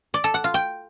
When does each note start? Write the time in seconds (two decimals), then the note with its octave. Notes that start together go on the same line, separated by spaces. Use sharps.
0.14 D5
0.24 A4
0.34 F#5
0.44 F4
0.54 G5